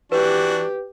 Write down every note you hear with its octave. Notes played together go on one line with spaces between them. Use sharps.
E3 D4 F#4 G4 B4